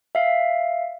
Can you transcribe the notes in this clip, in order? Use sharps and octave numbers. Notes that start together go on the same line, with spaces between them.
E5 F5